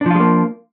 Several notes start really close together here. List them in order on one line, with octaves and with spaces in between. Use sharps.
D4 F3 F4 G#3 A#3